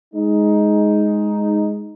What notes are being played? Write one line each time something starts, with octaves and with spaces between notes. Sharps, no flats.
G#3 D#4